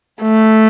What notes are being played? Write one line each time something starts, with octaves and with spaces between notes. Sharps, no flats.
A3